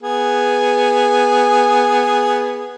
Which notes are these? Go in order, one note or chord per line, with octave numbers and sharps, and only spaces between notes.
B3 G#4